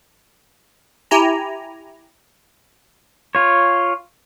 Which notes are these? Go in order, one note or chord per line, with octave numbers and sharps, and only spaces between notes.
E4 G4 G#5 A#5
F4 C#5